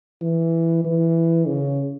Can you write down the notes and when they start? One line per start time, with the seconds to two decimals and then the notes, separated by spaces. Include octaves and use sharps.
0.22 E3
0.85 E3
1.48 C#3